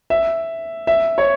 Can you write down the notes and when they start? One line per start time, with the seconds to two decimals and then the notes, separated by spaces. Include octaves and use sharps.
0.10 E5
0.87 E5
1.18 C#5